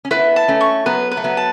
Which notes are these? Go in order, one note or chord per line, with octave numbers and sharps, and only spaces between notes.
C#4
B3 E4 B4
A5
A3 C#4
C#6
F#3 B3 B4
B4
A3
F#3 B3
A5